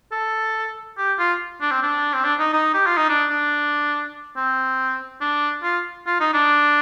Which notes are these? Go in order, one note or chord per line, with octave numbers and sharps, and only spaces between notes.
A4
G4
F4
D4
C4
D4
C4
D4
D#4
D#4
G4
F4
D#4
D4
D4
C4
D4
F4
F4
D#4
D4